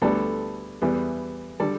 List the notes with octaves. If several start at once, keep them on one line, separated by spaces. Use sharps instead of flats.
D2 D3 G3 B3 A4 D5
E2 E3 G3 B3
D3 G3 A4 D5